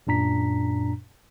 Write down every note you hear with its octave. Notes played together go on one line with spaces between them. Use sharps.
F#2 A#2 D4 A#5 B6